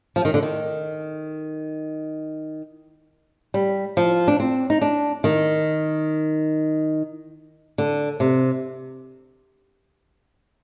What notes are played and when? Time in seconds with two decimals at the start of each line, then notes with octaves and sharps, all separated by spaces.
0.16 F3
0.25 D#3
0.34 D3
0.43 D#3
3.54 G3
3.97 F3
4.28 D4
4.40 C4
4.70 D#4
4.82 D4
5.24 D#3
7.78 D3
8.20 C3